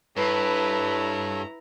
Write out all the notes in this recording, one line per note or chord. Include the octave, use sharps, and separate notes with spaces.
G2 E4 A4 B4 C#5 A#5